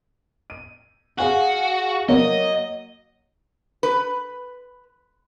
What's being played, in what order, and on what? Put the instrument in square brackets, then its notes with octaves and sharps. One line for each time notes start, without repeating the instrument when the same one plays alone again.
[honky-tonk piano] D#7
[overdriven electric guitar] F#4 [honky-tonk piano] G#4 F5 G#5
[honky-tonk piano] F#3 A#3 [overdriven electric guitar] D#5
[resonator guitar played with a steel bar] B4